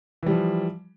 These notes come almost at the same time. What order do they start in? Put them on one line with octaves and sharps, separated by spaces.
E3 G3 F3